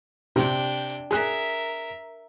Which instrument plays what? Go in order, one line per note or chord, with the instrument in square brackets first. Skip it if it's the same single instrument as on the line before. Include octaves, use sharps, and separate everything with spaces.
[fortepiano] C3 [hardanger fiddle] D4 G5
[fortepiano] G#4 F#6 [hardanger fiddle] A#4 E5